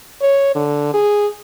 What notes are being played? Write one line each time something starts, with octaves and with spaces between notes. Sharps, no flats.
C#5
D3
G#4